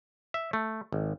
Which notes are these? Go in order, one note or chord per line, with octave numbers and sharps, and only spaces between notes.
E5
A3
G#1